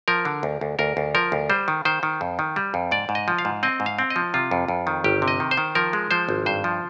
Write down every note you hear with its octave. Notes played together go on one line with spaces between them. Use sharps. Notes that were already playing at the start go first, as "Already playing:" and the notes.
F3 A#4
D3
D2
D2
D2 A#4
D2
F3 A#4
D2
G3 C5
D#3
D#3 C5
D#3
F2
D#3
G3
F2
G#2 D5
G#2
D#5
F3
F5
G#2
C4 D#5
G#2
F5
C4
D#5
F3
C3 F4
F2
F2
D#3
G1 G4
C3
D#5
D#3
C5
D#3
F3 A#4
G#3
F3 C5
G#1
G2 C5
F3